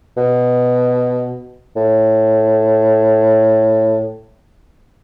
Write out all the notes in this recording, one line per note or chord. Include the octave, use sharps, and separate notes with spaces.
B2
A2